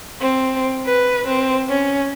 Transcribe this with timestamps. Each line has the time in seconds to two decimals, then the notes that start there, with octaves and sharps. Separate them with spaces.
0.21 C4
0.86 B4
1.27 C4
1.68 C#4